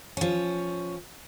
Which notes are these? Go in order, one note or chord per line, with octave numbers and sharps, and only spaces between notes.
F3 C#4